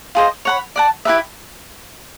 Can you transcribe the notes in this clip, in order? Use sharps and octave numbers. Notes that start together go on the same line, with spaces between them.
F4 G#4 C5 D#5
C#5 F#5 B5
D5 F#5 A5
E4 G4 B4 E5